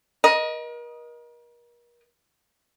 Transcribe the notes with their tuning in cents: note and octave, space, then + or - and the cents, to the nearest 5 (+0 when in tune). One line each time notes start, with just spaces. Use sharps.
A#4 +40 D#5 +0